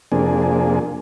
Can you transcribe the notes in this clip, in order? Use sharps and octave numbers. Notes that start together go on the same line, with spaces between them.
F2 C3 A#3 D4 G#4